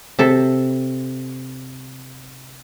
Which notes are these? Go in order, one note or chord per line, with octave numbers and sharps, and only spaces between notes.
C3 A4 E5